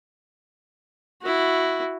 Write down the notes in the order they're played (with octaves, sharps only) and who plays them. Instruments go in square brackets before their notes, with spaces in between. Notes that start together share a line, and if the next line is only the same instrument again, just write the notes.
[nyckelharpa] E4 F#4